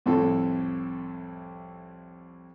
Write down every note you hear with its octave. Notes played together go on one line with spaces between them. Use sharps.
C2 F2 A2 C4 A4